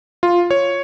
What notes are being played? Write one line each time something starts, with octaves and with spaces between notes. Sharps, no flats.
F4
C#5